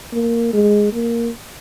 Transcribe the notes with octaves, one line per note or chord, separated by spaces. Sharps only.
A#3
G#3
A#3